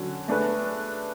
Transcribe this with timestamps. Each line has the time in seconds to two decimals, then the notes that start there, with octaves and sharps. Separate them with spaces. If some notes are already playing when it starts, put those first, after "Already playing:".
Already playing: D3 F#3 C#4 F#4
0.28 A3 D4 G#4 B4